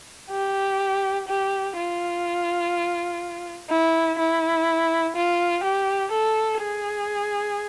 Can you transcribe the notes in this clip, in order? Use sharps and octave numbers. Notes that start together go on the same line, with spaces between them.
G4
G4
F4
E4
E4
F4
G4
A4
G#4